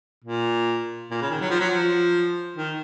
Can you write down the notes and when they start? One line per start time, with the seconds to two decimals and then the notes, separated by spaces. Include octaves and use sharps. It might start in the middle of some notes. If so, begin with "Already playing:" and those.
0.24 A#2
1.11 A#2
1.22 C#3
1.31 D#3
1.41 F#3
1.50 F3
1.60 F#3
1.70 F3
2.57 D#3